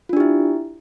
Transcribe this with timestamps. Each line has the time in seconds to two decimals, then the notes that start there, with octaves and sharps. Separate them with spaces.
0.09 F4
0.13 D4
0.17 G4
0.20 E4